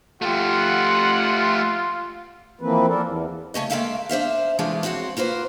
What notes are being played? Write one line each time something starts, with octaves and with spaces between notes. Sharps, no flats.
A3 F4 G4 F#5
E3 F3 A#3 C4 B4
A#3 D4 A4 A#4
E2
C#3 A3 C#4 D#5
G#3 A#3 A4 E5 F5 G5
D4 C5 E5 F5
E3 F3 G#3 A3 D4 F4
C4 E4 F#4 C5 C#5
A#3 F4 B4 C5